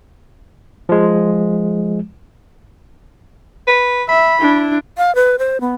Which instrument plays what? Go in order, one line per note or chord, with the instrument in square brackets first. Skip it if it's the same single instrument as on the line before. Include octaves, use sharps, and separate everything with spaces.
[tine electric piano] F3 G#3
[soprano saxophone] B4
[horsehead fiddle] E5 [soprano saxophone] B5
[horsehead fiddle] D4 E4
[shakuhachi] F5
B4
C5
B3